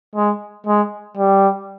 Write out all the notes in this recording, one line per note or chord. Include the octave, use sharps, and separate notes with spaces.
G#3
G#3
G3